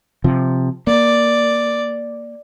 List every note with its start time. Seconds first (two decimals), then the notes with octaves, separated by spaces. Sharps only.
0.24 C3 F3
0.87 A#3 D5